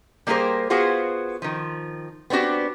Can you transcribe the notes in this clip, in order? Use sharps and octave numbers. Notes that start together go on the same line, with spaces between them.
G3 A#3 G4 G#4 A#4 C5
B3 F4 F#4 G#4 C5
D#3 F3
B3 C4 D4 F#4 G4